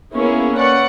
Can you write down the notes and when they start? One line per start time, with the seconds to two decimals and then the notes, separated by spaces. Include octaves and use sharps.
0.13 A#3 B3 C#4 E4 G#4
0.56 C#4 B4 D5 F#5